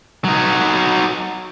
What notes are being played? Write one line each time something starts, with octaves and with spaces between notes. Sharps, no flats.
F#3 D#4